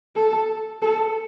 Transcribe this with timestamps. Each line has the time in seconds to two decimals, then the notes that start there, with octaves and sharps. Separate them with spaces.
0.16 A4
0.82 A4